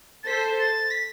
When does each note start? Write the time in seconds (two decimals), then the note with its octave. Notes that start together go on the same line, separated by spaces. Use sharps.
0.23 A6
0.27 A4 C5 B6
0.59 A6
0.91 B6